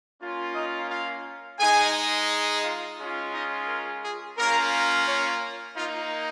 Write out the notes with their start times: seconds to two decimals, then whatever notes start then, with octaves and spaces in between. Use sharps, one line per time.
0.20 A#3 C#4 F4
0.54 D#4 D#5
0.89 F4 F5
1.59 G#3 D#4 G#4 G#5
2.64 F4 F5
2.98 G#3 C#4 F4
3.33 D#4 D#5
3.68 A#4
4.03 G#4
4.37 A#3 C#4 F4 A#4
5.07 C#4 C#5
5.76 A#3 D#4 F4 F5